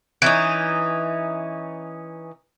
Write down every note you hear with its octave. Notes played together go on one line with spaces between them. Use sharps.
E3 C#4 D#4